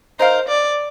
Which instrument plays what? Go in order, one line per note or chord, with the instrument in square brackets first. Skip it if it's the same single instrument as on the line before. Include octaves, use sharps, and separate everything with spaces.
[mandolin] D#4 A#4 F5 [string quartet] C5
[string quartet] D5